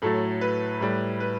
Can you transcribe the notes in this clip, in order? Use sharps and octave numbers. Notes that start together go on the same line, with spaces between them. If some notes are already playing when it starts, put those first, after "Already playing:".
A2 F#3 A3 A4
B4
A2 G3
B4